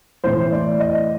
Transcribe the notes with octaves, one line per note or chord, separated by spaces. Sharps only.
A2 E3 C5
D5
D#5